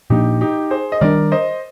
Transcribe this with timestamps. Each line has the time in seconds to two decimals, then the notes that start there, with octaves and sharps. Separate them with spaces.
0.10 A#2 F3 A#3 D4 D#4 G4
0.41 D#4 G4
0.71 G#4 C5
0.92 D#5
1.01 D#3 G3 A#3 D4 A#4 D5
1.31 C5 D#5